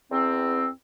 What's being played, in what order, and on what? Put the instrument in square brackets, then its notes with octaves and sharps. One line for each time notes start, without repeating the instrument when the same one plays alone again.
[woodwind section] E2 C4